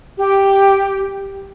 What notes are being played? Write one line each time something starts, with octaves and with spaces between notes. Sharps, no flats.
G4